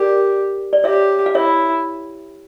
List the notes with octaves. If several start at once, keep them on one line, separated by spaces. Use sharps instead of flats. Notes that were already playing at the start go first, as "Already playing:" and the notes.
Already playing: G4 A#4 D5
D5
G4 C#5 E5
F5
E4 C#5 E5